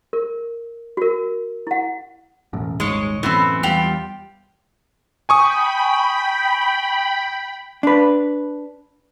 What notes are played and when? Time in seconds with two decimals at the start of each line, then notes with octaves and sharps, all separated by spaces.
0.13 A#4
0.97 F#4 A#4
1.67 E4 F#5
2.53 E1 A1 F#2
2.80 D#1 G#1 G#2 G#3 C#5 D#5
3.23 F#2 A2 E3 B3 C4
3.63 E2 G3 F4 G4 G5
5.29 G5 G#5 B5 C#6 D#6
7.83 D4 B4